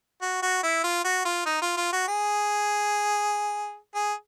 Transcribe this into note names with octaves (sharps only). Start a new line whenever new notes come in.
F#4
F#4
E4
F4
F#4
F4
D#4
F4
F4
F#4
G#4
G#4